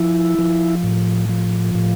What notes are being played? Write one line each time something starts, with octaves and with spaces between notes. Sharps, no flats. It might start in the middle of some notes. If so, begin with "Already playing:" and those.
Already playing: F3 E4
F3
A2
F3
A2